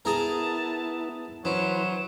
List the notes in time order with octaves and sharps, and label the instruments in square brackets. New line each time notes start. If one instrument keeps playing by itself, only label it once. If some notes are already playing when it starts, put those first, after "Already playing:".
[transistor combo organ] B3 E4 [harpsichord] G#4 A#4 [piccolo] A5
[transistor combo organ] E3 B4 C5 [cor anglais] F#3 [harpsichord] C#4 [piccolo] E7